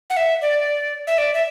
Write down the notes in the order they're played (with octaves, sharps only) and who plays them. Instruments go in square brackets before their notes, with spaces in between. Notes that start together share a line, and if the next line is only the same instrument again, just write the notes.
[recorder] F#5
E5
D5
E5
D5
E5